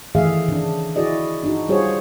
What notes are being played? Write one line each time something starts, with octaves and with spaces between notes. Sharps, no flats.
D#3 E3 A3 G#4 E5 F5
C#3 D4
E4 F#4 G#4 D5 D#5
D4 D#4 F#4
G3 F4 F#4 G#4 C5 C#5